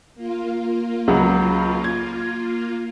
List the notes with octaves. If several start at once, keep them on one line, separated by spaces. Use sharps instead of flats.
A#3 F4
C#2 C#3 F#3
G#6